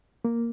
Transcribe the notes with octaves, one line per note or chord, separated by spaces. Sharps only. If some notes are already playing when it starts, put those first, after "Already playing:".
A#3